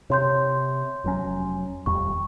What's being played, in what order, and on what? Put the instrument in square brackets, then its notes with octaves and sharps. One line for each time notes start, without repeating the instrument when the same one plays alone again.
[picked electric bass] C3 [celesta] C#5 C6 G6
[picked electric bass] F1 F#3 C#4
[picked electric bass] D#1 F2 G3 [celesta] C#6